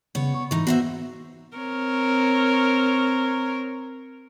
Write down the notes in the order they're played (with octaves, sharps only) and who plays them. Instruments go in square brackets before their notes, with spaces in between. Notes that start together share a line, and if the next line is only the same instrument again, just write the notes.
[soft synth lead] C#3 [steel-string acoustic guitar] B3 C#5
[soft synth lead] C#6
[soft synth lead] G#2 [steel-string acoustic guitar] E3 D#4
[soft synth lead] B3 [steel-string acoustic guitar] F#4 C5 E5
[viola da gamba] C4 A#4 C#5